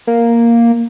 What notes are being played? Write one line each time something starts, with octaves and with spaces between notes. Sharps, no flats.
A#3